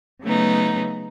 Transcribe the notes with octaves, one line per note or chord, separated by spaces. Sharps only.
C#3 F#3 A3 B3 D#4